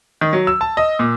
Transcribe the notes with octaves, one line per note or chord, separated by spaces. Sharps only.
D#3
F#3
E6
A5
D#5
A#2